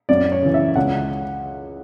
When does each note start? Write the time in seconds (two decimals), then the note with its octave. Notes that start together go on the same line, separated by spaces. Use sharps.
0.09 F#2 D5
0.32 C#5
0.42 C#3 E3
0.54 E5
0.76 C#2 F#5